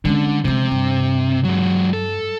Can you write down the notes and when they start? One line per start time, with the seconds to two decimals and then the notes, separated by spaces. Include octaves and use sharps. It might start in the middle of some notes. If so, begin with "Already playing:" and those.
0.05 D3 G#3 C#4
0.44 C3 F3 G#3
0.71 G2
1.44 F#3 G#3
1.93 A4